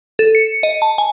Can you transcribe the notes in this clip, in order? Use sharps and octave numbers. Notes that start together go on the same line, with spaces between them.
A4
C#7
D#5
A5
G#5